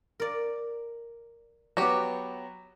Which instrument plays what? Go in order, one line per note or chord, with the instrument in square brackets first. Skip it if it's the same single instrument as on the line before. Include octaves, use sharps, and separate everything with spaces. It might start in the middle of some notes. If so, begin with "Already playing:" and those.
[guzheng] A#4 D5
[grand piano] F#3 B3 [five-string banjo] F#4 G4